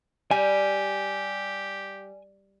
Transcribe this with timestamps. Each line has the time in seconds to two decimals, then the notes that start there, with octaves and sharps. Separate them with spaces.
0.31 G3 G4 G#5